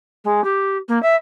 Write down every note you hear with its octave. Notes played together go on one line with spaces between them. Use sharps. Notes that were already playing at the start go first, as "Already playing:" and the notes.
G#3
G4
A#3
E5